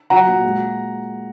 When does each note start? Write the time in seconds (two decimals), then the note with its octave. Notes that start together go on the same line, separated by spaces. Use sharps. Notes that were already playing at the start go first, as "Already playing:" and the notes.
0.10 F#3 F#5 A#5
0.27 A#2
0.44 G#3